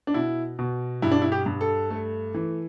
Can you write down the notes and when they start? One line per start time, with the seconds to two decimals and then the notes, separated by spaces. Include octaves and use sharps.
0.07 D4
0.14 B2 E4
0.59 B2
1.02 G2 E4
1.11 D4
1.22 E4
1.32 G4
1.46 G2
1.61 A4
1.90 A3
2.34 E3